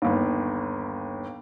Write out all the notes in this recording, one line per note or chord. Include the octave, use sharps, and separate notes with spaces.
G1 D#2